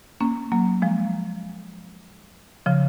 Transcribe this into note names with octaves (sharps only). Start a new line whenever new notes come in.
A#3 C#4
F#3 A#3
F3 G#3
C#3 F3